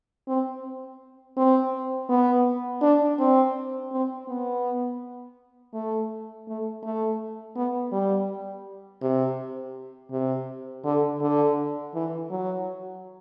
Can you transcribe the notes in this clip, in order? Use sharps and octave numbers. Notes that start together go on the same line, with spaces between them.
C4
C4
B3
D4
C4
C4
B3
A3
A3
A3
B3
G3
C3
C3
D3
D3
E3
F#3